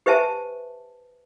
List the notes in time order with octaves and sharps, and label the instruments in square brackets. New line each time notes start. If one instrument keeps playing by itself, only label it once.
[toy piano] G4 B4 C5 E5 G#5 A5